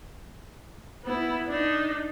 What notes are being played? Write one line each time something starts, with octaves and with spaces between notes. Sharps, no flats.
B3 E4
D4 D#4